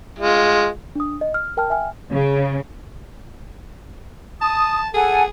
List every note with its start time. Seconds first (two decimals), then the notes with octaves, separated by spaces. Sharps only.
0.19 G#3 F4
0.95 D4 D#6
1.21 D#5
1.34 F6
1.57 A#4 G5 A5 F6
1.70 E5 G5 G#5 F6
2.13 C#3
4.42 A5 D#6
4.94 G#4 A4 F#5 G#5